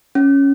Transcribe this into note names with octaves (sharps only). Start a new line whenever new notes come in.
C#4